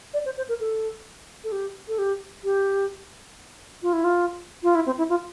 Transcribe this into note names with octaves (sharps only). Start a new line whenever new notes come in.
D5
C5
C5
A#4
A4
A4
G4
A4
G4
G4
F4
E4
F4
F4
E4
C4
E4
F4